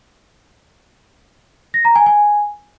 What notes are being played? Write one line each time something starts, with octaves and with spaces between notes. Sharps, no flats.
A#6
A#5
G#5
G#5